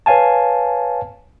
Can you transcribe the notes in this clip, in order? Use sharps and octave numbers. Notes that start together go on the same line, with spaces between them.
B4 C#5 F5 G#5 A5